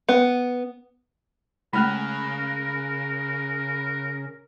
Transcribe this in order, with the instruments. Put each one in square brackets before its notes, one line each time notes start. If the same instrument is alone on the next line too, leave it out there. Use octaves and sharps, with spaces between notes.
[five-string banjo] B3
[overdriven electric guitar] C#3 [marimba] G#3 A3 [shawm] A#4 [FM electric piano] B5 F6 F#6